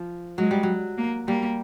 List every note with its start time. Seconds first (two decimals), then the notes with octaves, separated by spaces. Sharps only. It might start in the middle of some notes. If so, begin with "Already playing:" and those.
Already playing: F3
0.38 F#3 G#3
0.51 G3
0.63 F#3
0.98 A#3
1.28 G3 A#3